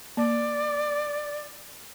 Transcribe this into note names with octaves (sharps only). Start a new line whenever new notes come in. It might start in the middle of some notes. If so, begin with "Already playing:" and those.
A#3 D5